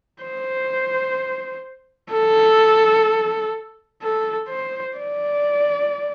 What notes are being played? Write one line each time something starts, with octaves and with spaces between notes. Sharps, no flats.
C5
A4
A4
C5
D5